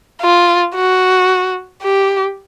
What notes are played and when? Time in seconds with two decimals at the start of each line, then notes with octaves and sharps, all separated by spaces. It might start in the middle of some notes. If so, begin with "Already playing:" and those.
0.21 F4
0.75 F#4
1.82 G4